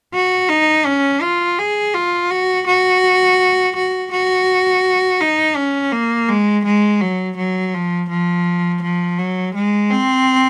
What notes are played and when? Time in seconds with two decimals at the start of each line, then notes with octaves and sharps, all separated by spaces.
0.14 F#4
0.49 D#4
0.86 C#4
1.22 F4
1.59 G#4
1.94 F4
2.30 F#4
2.67 F#4
3.76 F#4
4.12 F#4
5.21 D#4
5.56 C#4
5.92 A#3
6.29 G#3
6.65 G#3
7.01 F#3
7.37 F#3
7.74 F3
8.09 F3
8.82 F3
9.19 F#3
9.55 G#3
9.91 C4